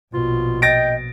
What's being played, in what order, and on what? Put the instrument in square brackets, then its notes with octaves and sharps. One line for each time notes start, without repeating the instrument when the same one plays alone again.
[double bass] A#1 B2 [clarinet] F4
[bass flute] D#5 [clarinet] G5 [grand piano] A6 A#6 D7